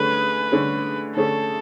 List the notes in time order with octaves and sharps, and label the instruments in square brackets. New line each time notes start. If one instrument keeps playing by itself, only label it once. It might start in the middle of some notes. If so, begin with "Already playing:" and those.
Already playing: [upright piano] D3 A3 C#4 G#4 [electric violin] B4
[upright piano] D3 A3 C#4 G#4
[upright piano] D3 A3 C#4 G#4 [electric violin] A4